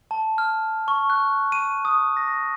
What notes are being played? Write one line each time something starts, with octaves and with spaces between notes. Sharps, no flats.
A5
F6
C#6
F#6
D#7
D#6
A#6